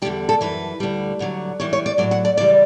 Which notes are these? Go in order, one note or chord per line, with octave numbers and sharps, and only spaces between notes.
E2 D3 G3 G4
A4
F#2 C#3 E3 B4
D2 D3 G3
D2 D3 F#3
F#2 E3 G3 C#5
C#5
D5
A2 F#3 D5
F#5
D5
D2 C#3 E3 G3 D5